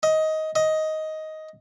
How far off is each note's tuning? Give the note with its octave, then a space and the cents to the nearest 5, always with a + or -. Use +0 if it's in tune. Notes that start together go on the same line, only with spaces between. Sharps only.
D#5 +15
D#5 +10